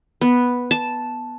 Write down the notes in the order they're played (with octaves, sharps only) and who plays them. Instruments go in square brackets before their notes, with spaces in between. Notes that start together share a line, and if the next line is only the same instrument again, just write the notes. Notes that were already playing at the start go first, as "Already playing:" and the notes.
[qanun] B3
A5